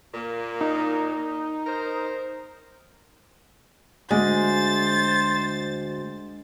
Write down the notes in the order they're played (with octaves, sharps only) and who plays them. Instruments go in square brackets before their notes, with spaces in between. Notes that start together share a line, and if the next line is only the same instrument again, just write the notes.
[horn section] A#2 A#3
[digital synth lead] D#4
[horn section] A#4 C5
[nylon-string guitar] D2 [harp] G#3 [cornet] C5 [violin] A6